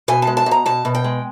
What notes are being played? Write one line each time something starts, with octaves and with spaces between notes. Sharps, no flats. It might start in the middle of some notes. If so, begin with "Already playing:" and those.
B2 G#5
G#3 A5
A5
B2
A#5
B2 A5
B2
G5
G#3